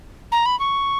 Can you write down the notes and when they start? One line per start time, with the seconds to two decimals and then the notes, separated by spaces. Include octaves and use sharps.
0.32 A#5
0.46 B5
0.59 C#6